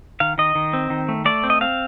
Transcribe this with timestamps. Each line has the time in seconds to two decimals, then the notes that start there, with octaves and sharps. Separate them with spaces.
0.20 D#3 F5
0.38 D#3 D#5
0.55 D#3
0.73 C4
0.90 D#3
1.09 A3
1.25 A3 D5
1.43 C4
1.50 D#5
1.61 C4 F5